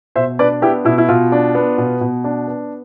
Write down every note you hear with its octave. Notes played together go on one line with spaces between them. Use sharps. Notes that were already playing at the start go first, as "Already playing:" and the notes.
B2 C5 E5
D4 B4 D5
B3 E4 G4
B2 E4
E4
B2 F4
D4
B3
B2
B2
D4
B3